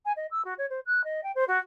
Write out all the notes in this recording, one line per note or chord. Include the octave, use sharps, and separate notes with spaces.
G#5
D#5
E6
F#4
C#5
C5
F#6
D#5
G5
C5
F#4